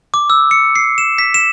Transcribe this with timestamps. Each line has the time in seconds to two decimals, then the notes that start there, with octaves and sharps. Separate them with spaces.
0.14 D6
0.30 E6
0.51 C#7
0.76 C7
0.98 E7
1.18 B6
1.34 E7